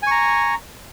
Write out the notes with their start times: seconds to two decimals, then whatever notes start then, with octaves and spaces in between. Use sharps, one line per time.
0.03 G#5
0.07 C#6
0.11 A#5